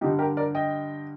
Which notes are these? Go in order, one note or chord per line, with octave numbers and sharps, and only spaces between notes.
G2 D3 D#4 G4
G4 A#4
A#4 D5
D#5 G5